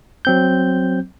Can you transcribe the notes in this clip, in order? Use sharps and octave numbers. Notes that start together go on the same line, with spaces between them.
F#3 C4 G6